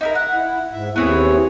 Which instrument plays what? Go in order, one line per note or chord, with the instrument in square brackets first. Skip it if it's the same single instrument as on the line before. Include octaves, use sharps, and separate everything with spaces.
[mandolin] D#4 E4 A#4
F#5
[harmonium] E4
G#2 E5
[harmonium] D#2 E4 C#5 [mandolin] B3 C4 G#4